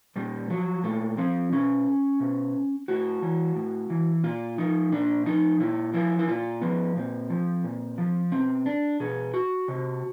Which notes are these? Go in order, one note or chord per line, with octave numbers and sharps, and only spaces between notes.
A#2 G3
F3 F#3
A#2 A3
F3 C4
B2 C#4
B2
A2 F#4
E3
A2
E3
A#2 F4
F3 D#4
A#2 D4
F3 D#4
A#2 E4
F3 E4
E4
A#2 F4
F3 B3
A#2 C4
F3
A#2
F3
B2 C4
D4
B2 G#4
F#4
C3